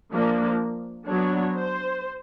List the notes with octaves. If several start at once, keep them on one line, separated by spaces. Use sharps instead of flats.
F3 A#3 D4
F#3 B3 D4 C#5
C5